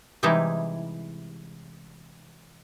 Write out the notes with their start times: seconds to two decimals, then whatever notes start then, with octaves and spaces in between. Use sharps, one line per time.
0.23 C3 E3 G3 G#3 D#4 E4